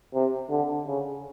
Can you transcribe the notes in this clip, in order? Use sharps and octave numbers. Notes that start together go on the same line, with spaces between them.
C3
D3
C#3